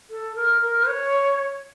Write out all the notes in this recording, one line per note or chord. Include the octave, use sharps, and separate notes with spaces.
A4
A#4
A#4
C#5